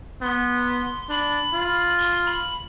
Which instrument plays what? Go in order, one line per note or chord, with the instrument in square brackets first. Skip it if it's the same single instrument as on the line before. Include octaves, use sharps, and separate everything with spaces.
[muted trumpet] B3 [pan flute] C6
[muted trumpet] D4 [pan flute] B5
[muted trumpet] F4
[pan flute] C6
B5